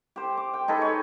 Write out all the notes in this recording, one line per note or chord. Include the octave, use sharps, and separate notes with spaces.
G4 C5
D6
G5
D#4 G#4 A4 B4
C#5